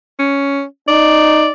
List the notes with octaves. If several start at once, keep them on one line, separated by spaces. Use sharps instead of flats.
C#4
D#4 D5